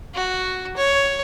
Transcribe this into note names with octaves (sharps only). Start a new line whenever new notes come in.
F#4
C#5